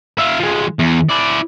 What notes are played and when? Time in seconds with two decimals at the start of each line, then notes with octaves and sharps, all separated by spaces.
0.19 F4 E5
0.40 F3 G#3
0.79 E2
1.09 E4 D5